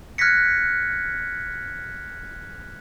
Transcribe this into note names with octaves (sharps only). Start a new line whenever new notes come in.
F6 F#6 G#6 A#6 B6 C#7